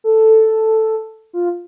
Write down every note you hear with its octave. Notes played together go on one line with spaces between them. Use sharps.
A4
F4